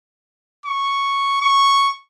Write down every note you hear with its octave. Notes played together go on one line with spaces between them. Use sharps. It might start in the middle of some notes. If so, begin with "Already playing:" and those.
C#6
C#6